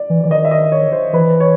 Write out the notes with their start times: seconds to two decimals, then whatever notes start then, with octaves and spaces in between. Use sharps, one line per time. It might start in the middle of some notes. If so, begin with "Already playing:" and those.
Already playing: D5
0.10 E3
0.24 E3 D5
0.30 D#3 D#5
0.45 E5
0.51 D#5
0.72 C#5
0.92 C5
1.13 E3 B4
1.40 C#5